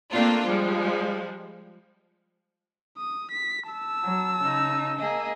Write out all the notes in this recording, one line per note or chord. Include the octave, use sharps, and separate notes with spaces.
A3 A#3 C4 D4 F4
F3 G3 G#3
D#6
B6
A5 E6
F#3
C#3 D#4
A#3 G#4 D#5